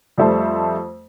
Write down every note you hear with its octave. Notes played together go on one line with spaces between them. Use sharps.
F2 G3 A3 C5 A5